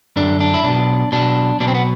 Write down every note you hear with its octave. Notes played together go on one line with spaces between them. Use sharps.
F#2 D3 D4
D4
E4
B1 B2 D4
B1 B2 D4
B1 B2 D4
C4
B3